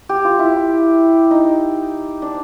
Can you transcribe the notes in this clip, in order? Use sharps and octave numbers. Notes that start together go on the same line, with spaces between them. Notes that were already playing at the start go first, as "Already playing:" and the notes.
G4
F4
E4
D#4
D4